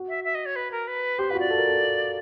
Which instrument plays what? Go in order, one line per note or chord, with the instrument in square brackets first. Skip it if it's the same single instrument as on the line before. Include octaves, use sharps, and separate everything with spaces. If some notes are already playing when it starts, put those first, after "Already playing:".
Already playing: [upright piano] F#4
[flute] E5
E5
D#5
C#5
B4
A#4
B4
[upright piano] G4 [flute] C5
[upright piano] F4 [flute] B4
[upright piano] F#4 [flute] D5
[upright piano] A4
A#4
A4